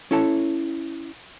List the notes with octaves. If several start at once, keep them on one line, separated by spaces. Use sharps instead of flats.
C#4 E4 A4 C#5 A5